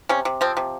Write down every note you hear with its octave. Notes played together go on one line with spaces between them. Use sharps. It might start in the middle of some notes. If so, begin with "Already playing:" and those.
C3 C#4
C3
F3 C4
C3